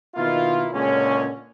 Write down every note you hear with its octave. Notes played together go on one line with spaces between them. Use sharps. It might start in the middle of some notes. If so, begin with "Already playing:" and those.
B2 D#3 A#3 E4 F4
C#2 A#2 D3 G#3 C#4